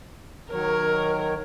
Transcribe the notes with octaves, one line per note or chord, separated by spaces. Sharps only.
D#3 F#3 A#4 C#5